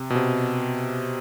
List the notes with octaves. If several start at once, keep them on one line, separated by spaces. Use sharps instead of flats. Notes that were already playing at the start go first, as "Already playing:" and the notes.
Already playing: C3
B2
C3